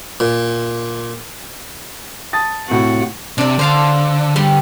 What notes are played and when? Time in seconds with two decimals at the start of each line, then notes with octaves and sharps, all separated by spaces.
0.20 A#2
2.33 A5 D#6 A6
2.68 A2 C3 F#4
3.38 C3 D4 D5
3.59 D3 C5 F5 A5
4.36 D3 G3